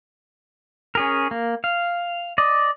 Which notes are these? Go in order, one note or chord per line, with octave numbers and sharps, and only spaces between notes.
C#4 G#4 A#4
A#3
F5
D5 D#5